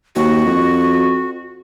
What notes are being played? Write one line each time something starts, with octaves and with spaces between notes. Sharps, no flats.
D#2 F#4
F2